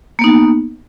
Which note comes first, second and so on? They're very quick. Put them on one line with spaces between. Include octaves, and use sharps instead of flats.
A#3 B3 D#4